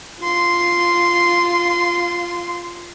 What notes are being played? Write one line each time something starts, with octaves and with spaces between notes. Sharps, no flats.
F4 C6